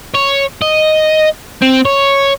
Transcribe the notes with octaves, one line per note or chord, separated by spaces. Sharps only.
C#5
D#5
C4
C#5